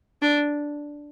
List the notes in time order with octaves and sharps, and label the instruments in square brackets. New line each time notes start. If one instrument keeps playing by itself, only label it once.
[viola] D4